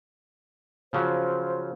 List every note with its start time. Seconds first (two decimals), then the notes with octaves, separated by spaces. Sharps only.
0.93 C#3 F3 F#3 C5